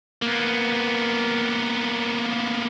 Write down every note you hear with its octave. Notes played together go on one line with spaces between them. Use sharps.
A#3 B3